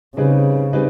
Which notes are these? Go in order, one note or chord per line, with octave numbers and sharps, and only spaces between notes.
C#3 G3 C4 D#4 G#4 B4
G3 C4 D#4 G#4 B4